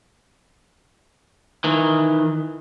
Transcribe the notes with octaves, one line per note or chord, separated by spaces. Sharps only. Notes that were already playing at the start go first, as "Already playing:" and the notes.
D#3 E3